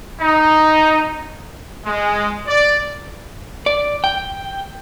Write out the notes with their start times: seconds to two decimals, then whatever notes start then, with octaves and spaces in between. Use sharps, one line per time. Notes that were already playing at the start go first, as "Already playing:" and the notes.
0.20 D#4
1.85 G#3
2.47 D5
3.66 D5
4.04 G5